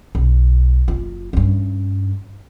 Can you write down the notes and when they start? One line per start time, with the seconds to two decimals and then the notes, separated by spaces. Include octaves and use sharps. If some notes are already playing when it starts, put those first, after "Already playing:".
0.15 B1
0.88 F#1 F4
1.33 G2 C#4